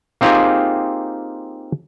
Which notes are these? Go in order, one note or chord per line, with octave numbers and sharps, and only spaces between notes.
A#3 C4 D#4 F4 G4 G#4